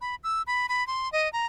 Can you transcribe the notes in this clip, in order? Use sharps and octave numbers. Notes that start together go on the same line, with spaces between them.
B5
E6
B5
B5
C6
D#5
A#5